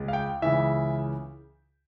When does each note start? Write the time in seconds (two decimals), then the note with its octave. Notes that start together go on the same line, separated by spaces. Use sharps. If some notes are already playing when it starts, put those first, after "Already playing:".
Already playing: C#2 G#3
0.08 F5
0.13 G5
0.42 C#2 C#3 E3 E5